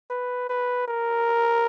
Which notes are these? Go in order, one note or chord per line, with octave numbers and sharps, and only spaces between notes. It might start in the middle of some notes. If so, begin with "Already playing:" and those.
B4
B4
A#4